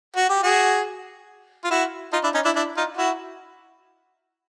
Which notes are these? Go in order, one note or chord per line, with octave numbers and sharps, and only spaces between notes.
F#4
G4
F#4 G#4
F4
E4 F#4
D#4 F4
D4 E4
C#4 D#4
D4 E4
D4 E4
D#4 F4
E4 F#4